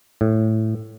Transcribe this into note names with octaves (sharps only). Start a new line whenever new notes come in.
A2